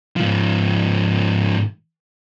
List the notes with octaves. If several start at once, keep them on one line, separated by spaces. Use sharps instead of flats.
G#2 F3